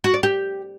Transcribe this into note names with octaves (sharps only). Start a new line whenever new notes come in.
F#4
D5
G4